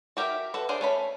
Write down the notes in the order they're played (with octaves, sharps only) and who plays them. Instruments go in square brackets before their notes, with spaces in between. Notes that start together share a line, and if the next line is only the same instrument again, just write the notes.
[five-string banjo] F#4 G4 A#4 E5
F#4 A4 B4
D4 G#4 A#4 C5
A3 C#4 B5